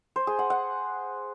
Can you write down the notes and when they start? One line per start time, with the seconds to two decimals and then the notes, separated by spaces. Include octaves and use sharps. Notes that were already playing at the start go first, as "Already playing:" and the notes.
0.16 C5
0.27 G#4
0.39 F#5
0.50 F#5